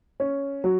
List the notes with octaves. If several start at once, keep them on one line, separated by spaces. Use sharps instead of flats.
C#4
F#3